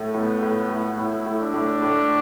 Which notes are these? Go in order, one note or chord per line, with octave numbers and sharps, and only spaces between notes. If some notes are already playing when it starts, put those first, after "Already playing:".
Already playing: A2 A3
A2 B3
A2
A2
A2 E4
A2
D4
A2
A2